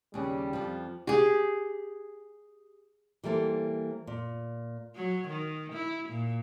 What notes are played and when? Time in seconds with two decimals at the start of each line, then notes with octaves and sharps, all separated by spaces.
0.14 D#2 C#3 G3
0.53 F2 F3
1.07 G4 G#4
3.23 E3 G3 A#3 A4 C5
4.07 A#2
4.96 F#3
5.28 D#3
5.74 E4
6.10 A#2